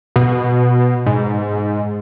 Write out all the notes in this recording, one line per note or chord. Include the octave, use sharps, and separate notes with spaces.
B2
G#2